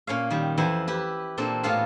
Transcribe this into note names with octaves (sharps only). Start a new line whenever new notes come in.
A#2 C#4 C#5 F5
D#3 G3
F2 E3 E4 C5 F#5
E4 G4 B4
A#2 C4 D4 A4
A2 A#3 B3 F4 A4 F5